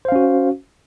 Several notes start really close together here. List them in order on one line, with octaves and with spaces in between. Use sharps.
C5 F5 C#4 F#4